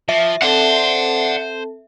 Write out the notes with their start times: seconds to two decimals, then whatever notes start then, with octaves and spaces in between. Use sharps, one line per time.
0.09 F3 E5
0.42 C4 A4 C5 D5 F#5 A5